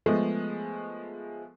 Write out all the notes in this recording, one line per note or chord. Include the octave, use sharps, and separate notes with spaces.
F3 G#3 A3 B3